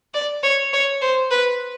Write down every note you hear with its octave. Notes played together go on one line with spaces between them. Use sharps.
D5
C#5
C#5
C5
B4